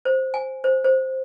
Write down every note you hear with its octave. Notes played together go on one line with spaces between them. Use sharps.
C5
G#5
C5
C5